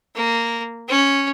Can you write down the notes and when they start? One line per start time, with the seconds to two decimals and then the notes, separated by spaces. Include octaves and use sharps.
0.15 A#3
0.88 C#4